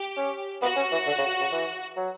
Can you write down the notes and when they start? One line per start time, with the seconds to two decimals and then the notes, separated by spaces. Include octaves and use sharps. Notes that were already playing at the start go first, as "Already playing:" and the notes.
Already playing: G4
0.17 C#4
0.62 B3 F#4
0.76 C#4
0.92 E3
1.07 D3
1.18 C#3
1.41 C#3
1.52 E3
1.96 F#3